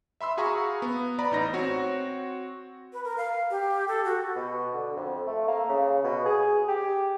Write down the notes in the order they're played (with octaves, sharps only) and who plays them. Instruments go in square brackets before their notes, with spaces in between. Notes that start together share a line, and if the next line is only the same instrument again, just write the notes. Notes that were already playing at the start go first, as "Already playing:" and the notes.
[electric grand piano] E5 B5 C6 E6
F#4 G#4 F5 A#5 B5 C#6
B3
B4 D5 A#5 B5
A1 D#4 A#6
C4 F#4 C#5
[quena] B4
A#4
F5
G4
A4
F#4
[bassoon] B2
D3
F2
A3
A#3
C#3
B2
G#4
G4